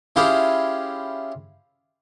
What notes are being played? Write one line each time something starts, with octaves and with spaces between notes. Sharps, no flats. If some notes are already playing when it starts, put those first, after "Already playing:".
C#4 E4 F4 G4 G#4